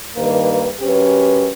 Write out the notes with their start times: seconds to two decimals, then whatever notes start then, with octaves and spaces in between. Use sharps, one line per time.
0.16 G2 D#3 A#3 B4
0.80 F#2 C#4 G4 B4